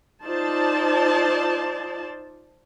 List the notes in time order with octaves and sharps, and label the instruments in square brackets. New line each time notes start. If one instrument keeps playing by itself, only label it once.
[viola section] D#4 F4 C5 D5 A5